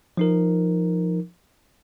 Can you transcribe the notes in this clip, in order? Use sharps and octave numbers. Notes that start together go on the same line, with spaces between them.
F3 D#4 A#4